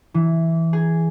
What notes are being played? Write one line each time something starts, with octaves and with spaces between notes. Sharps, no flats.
E3
G#4